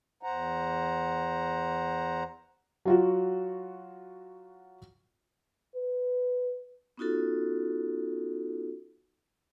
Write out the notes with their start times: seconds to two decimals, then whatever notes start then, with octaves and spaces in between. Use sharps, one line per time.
0.23 E2 C5 F#5 A#5
2.85 F#3 F4 F#4
5.76 B4
6.97 B3 C#4 D#4 F4 F#4 A4